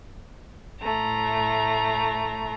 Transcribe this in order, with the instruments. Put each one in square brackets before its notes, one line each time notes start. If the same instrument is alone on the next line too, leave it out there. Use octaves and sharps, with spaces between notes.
[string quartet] A2 A3 A#5